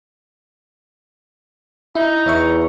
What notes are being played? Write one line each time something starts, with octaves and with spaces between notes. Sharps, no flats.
D#4 E4 E5 A#5
E2 C#5 E5 C#6